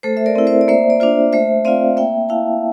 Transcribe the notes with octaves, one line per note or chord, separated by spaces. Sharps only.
A3 A4 C5
E5
A#4 D5
C4 E4
C5 E5
D5
A#3 C5 E5
D5
D4 F4 C5 E5
A3 C5 E5
C4 F4 D5 F5
A#3 E5 G5
E4 F5 A5